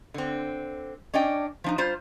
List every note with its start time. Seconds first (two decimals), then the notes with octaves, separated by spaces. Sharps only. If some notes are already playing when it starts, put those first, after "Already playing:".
0.14 D3 C4
1.14 C#4 D4 D5 D#5 G5
1.64 F3 D4 D#4
1.78 G3 F4 C5